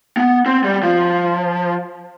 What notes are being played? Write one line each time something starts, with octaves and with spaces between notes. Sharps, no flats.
B3
C4
G3
F3